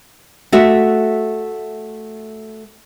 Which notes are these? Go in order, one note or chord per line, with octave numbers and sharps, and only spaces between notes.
A3 F#4 E5